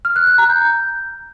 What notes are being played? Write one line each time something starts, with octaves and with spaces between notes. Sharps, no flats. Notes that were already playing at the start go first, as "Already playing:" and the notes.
F6
F#6
F#6
A#5
G6